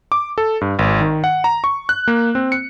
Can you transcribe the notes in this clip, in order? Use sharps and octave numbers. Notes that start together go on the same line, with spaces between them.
D6
A4
G2
G#1
D#3
F#5
A#5
C#6
F#6
A#3
C4
C#7